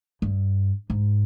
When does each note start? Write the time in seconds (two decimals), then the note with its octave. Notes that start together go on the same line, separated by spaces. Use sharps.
0.22 G2
0.90 G#2